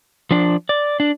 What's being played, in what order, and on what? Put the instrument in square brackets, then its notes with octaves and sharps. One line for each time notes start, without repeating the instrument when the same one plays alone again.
[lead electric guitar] F3 D4
D5
D4